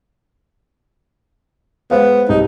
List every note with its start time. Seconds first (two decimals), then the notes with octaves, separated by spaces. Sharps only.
1.91 G#3 B3 C5 F5
2.29 C2 D#4 D#5